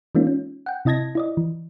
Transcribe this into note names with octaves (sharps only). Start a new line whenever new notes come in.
E3 G#3 A#3 C#4 D#4 F4
C#4
F#5 G5
C3 E4 D#5 A5 G#6 A#6
E4 D5 D#5
E3